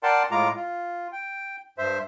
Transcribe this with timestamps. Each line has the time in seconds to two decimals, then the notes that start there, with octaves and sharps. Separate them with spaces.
0.03 A#4 D5 F#5 G5 A5 C6
0.31 A2 G#3 F4 A#5 D6
0.56 F4
1.12 G5
1.78 G2 C5 E5